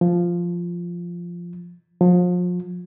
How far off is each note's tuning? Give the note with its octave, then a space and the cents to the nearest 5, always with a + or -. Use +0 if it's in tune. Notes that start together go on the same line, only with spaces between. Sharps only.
F3 -5
F3 +35